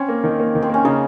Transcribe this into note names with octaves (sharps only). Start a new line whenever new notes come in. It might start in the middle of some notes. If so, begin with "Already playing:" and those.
Already playing: C4 C#4
A#3
D#3
A#3
D#3
C4
A#3 C#4
C#3 D#4